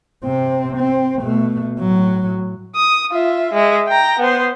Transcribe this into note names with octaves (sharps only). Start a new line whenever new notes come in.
C3 C4
C4
B2 A3
A2 F#3
D#6
F4 E5
G#3 E5
G5 A#5
B3 C5